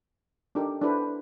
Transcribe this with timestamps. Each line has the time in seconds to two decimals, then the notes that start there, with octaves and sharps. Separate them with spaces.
0.55 D4 D#4 G4 A4 A#4
0.81 D4 E4 F#4 A4 B4 C5